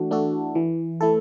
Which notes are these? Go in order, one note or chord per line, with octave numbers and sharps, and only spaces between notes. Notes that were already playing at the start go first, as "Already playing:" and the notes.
Already playing: E3 A3 D4 F#4 A4
A3 D4 F#4 A4
E3
A3 E4 A4